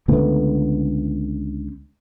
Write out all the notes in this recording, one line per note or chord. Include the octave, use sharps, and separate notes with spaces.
C#2 D3 A3 B3